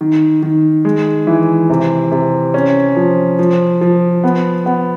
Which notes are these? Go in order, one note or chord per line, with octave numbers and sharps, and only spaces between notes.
D#3
D#3
G#3
E3
C3
C3
C#4
F3
F3
F3
B3
B3